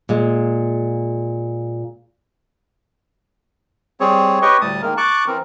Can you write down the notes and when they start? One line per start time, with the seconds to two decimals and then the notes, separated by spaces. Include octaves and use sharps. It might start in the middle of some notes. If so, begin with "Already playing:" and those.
0.09 A#2 G#3
4.00 G3 C4 G#4 C#5
4.42 G4 B4 C#5 D#5 G5 C#6
4.61 D2 A2 G3 A3 A5 D#6
4.82 D#3 G#3 A#3 A#4
4.97 A5 C#6 D6 F#6
5.27 E3 C4 A#4